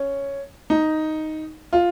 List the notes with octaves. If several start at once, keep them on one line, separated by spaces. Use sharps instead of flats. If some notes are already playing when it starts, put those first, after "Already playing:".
Already playing: C#4
D#4
F4